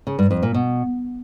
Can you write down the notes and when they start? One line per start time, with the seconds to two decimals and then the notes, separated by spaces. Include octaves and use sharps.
0.07 C#3
0.19 G2
0.31 F2
0.43 A#2
0.54 B2